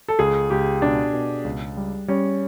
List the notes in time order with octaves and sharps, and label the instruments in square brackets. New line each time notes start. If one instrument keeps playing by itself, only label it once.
[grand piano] A4
[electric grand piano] C#2 [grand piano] G#4
[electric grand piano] C#2 [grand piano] G4
[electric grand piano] B2 [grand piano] D4
[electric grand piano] B2
C#2
G3
[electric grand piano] G3 [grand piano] C#4